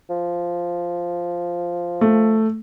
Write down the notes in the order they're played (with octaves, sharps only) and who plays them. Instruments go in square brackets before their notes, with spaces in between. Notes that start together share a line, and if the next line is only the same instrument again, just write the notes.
[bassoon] F3
[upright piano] A3